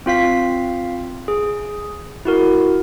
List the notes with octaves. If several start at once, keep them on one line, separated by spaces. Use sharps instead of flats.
C4 F4 F5 B6
G#4
E4 F#4 A#4